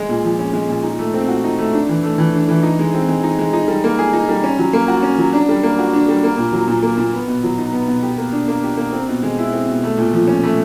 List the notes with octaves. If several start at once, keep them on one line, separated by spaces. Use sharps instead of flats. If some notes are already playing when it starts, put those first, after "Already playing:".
Already playing: G#3
A#2
F3
C#4
G#3
A#2
D#4
A3
C4
F#4
D#4
A3
D4
E3
A3
E3
D4
E3
D#4
G#3
C4
G#3
D#4
G#3
D#4
G3
A#3
G#4
D#4
G3
C#4
F#3
A#3
F#4
C#4
F#3
D4
G3
A#3
F#4
D4
G3
A#3
A#2
F#3
A#2
A#3
A#2
B3
B2
F#3
D#4
B3
B2
G4
A#3
D4
A#3
G4
A#3
C4
B2
G#3
E4
C4
B2
A3
A#2
F3
C#4
A3